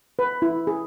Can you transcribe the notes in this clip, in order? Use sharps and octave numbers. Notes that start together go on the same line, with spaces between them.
B4
E4
G#4